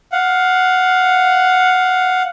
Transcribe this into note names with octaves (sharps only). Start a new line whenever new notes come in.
F5 F#5